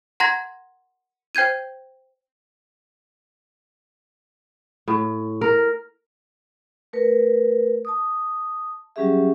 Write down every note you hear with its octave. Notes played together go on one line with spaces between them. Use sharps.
F#5 A#5 C6 G#6 A#6
C5 G5 G6 G#6 D#7
A2
A#4
A3 A#4 B4
A5 D#6
F#3 G3 C#4 G4 G#4 E5